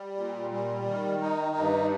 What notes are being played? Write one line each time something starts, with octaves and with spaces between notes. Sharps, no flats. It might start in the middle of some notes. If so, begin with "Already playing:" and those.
Already playing: G3
A#2
G3
D#3
D#4
G2